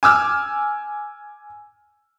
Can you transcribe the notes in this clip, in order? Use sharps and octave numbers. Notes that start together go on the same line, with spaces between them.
G#5 D6 E6 F6